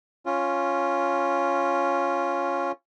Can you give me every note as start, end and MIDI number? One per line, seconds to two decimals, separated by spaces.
0.26 2.72 61
0.26 2.72 65